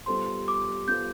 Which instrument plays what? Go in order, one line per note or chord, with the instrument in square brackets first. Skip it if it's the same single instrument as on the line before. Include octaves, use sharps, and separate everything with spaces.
[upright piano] G3 B3 F4 A4 C5 [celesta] C6
[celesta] D6
[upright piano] G3 B3 F4 A4 C5 [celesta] G6